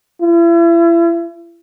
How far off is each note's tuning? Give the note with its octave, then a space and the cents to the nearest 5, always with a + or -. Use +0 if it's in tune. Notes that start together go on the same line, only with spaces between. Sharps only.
E4 +40